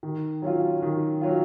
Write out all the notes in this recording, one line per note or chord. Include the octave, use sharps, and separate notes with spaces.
D#3
F#3 C#4 F4
D#3
F#3 C#4 F4